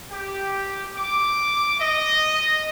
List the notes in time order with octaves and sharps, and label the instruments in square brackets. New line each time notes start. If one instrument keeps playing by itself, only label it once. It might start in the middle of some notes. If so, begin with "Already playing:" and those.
[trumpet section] G4
D6
D#5